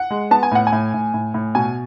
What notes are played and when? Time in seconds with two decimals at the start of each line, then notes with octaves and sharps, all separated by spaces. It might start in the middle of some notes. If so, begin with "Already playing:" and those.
Already playing: F#5
0.10 G#3
0.31 B3 A5
0.43 G#5
0.51 A2 F#5
0.67 G#5
0.72 A2
0.94 A2
1.14 A2
1.34 A2
1.55 B2 G#5